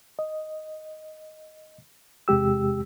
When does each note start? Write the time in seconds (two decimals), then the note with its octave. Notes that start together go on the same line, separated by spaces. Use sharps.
0.19 D#5
2.28 E2 C3 G#3 G4 E6